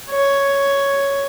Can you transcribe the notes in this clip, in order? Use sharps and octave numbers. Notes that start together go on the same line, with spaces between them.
C#5